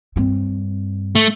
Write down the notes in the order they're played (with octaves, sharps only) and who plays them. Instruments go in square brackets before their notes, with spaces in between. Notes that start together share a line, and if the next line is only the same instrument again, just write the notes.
[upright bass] G2 C4
[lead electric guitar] A3